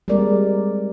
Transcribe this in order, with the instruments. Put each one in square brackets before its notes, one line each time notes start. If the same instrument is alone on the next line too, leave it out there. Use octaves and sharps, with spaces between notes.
[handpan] G3 G#3 A#3 C4 A#4 D5